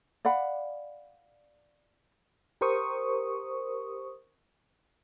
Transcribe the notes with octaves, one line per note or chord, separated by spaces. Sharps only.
D5 F5 F#5 B5
G4 A#4 C5 C#6 D#6